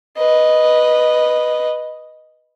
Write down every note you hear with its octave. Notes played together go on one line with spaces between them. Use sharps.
B4 D#5